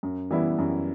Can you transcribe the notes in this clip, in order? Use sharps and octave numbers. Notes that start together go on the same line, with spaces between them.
F#2
E3 G3 B3 E4
F#2